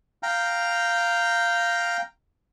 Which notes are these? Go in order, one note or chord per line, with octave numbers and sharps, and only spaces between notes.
F5 G5 A#5